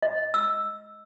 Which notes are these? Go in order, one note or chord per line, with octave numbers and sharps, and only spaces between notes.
D#5
E6